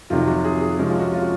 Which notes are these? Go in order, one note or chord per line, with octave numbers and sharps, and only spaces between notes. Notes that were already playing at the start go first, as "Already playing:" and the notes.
F2 C3 D#3 F#3 F4
F#4
G#4
G#4
C3 F3 G#3 C#4 F#4
F4
F#4
F4
F#4